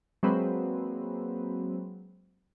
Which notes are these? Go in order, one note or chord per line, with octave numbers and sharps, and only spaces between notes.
F#3 G#3 A#3 C4 B4